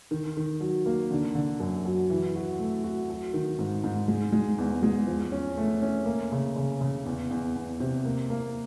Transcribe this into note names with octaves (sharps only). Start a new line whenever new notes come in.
D#3
D#3
F#3
A#3
D3
D3
F#2
F#3
E3
F#4
A3
F#4
F#3
D#3
G#2
G#2
G#3
G#3
E2
G#3
F3
C#4
A3
C#4
A#3
C#3
C#3
C#3
E2
E2
E2
C3
A#3
A#3